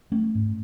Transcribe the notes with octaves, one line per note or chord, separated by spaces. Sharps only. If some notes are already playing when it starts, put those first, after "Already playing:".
A3 C#4
G#2